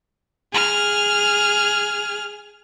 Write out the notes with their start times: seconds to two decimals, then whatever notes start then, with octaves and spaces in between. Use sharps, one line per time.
0.53 G#4 F6